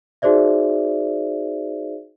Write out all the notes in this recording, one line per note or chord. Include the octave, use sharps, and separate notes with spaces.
D#4 F#4 G#4 C5 D5 E5